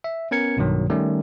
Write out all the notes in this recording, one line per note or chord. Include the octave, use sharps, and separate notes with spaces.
E5
B3 C#4 A#4 G#6 C#7
B1 G2 B2 D#3 F#3
D#3 G3 A3 C#4